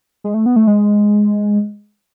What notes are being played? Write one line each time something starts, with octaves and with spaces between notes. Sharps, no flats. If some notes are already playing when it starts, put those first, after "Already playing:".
G#3
A3
B3
A3
G#3